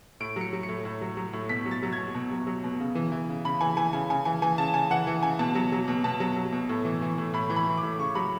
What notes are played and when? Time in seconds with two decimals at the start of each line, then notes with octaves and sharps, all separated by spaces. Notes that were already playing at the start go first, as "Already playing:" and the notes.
0.20 A2 D7
0.36 F#3
0.41 C#7
0.53 F#3
0.63 C#7
0.69 A2
0.85 A2
1.01 F#3
1.17 F#3
1.33 A2
1.49 B2 B6
1.66 F#3
1.71 A6
1.83 F#3
1.93 G#6
1.98 B2
2.14 B2
2.32 F#3
2.47 F#3
2.64 B2
2.80 C#3
2.95 E3
3.12 E3
3.29 C#3
3.44 C#3 B5
3.61 E3 G#5
3.77 E3 G#5
3.93 C#3 G#5
4.10 C#3 G#5
4.25 E3 G#5
4.42 E3 G#5
4.58 C#3 A5
4.74 C#3 G#5
4.91 E3 F#5
5.07 E3
5.23 C#3 G#5
5.39 B2 A5
5.55 F#3
5.72 F#3
5.88 B2
6.04 B2 A5
6.20 F#3
6.36 F#3
6.52 B2
6.69 A2
6.85 E3
7.02 E3
7.18 A2
7.33 A2 B5
7.50 E3
7.56 B5
7.67 E3
7.77 D6
7.83 A2
7.99 C#3 C#6
8.15 F#3 B5